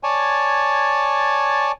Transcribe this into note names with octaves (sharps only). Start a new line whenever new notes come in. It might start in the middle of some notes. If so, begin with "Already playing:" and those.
C#5 D5 G#5 A5